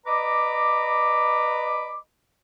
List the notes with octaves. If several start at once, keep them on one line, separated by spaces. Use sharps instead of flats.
B4 D5 D#5 A#5 B5 D6